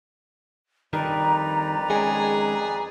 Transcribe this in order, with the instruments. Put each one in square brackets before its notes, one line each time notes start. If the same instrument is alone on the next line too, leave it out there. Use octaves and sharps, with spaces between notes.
[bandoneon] F2 B4 D5 [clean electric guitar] D#3 G3 D4 [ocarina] A#5
[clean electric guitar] D#3 G#3 C#4 [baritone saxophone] G#4